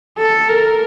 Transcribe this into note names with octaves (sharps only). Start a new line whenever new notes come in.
A4
A#4